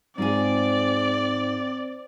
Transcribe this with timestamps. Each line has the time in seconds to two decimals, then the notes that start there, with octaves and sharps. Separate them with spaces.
0.18 G#2 C4 F4 G#4 D5